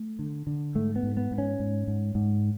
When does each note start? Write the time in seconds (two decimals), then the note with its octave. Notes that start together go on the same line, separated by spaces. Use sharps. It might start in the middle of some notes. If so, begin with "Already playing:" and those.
Already playing: A3
0.19 D3
0.47 D3
0.75 G#2 A3
0.96 B3
1.03 G#2
1.17 B3
1.31 G#2
1.38 C#4
1.60 G#2
1.87 G#2
2.15 G#2